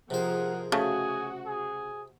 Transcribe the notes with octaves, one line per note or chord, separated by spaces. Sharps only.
C3 F3 G#4 A#4 C5 F#5
C#3 A3 F#4 G#4
G#4